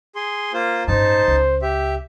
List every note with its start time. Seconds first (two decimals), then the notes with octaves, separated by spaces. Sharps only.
0.15 G#4 C6
0.53 A#3 F4 C5
0.88 A1 G2 D#4 C5 A5
1.28 C#2
1.62 G4 E5